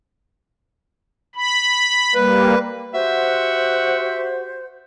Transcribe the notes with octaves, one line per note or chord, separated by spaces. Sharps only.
B5
G3 A#3 B4
F#4 G4 C5 E5 F#5